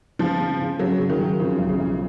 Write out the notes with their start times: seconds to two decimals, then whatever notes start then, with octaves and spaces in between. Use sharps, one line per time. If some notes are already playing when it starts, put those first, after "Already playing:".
0.19 C#3 F3
0.39 C#3
0.59 C#3
0.79 C#3 F#3
0.99 C#3
1.09 D#3
1.19 F#3
1.40 C#3 F3
1.59 B1
1.69 C#3
1.79 B1